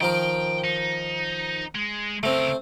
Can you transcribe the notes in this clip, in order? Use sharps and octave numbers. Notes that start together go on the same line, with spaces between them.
D#3 F3 A#4 G5
D#4
G#3
C#3 A3 C4 A#4